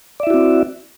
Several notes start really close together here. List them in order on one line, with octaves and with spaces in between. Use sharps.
D5 E5 E4 F#4 C4